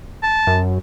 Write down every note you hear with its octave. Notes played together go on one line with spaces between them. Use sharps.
A5
F#2